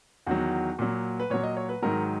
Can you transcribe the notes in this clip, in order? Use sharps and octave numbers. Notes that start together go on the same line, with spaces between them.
E2 D#3 F#3 F#4
A#2 F#3
B4
A#2 F#3 C#5
D#5
C#5
B4
G#2 D#3 F#3 A#4